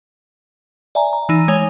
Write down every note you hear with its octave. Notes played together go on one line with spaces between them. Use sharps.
D5 E5 G#5 A#5
A#5
E3 D#4 D#7
G#3 C#5 G#5 F7